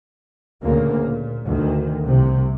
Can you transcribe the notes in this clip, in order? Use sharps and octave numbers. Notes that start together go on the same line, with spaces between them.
D2 A#2 C#3 A#3
A#2
D2 D#3
C2 C3